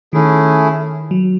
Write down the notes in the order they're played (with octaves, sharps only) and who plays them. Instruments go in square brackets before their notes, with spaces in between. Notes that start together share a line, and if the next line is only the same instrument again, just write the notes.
[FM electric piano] D#3 [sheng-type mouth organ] A3 C#4 E4 G#4
[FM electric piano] F#3